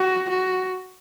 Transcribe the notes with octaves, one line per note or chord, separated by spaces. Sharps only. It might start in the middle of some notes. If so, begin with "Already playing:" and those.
Already playing: F#4
F#4